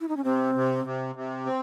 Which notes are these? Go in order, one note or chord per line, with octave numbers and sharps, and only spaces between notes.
E4
D#4
C#4
C3 C4
C3
C3
C3
C4